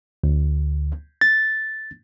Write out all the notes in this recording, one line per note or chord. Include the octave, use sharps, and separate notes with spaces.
D2
A6